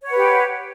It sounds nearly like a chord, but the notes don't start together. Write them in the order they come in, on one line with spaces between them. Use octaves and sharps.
C#5 F#5 B4 G4